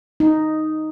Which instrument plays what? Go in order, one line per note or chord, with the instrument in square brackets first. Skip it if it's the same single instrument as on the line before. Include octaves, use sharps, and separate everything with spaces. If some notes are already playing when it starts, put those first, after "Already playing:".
[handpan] D#4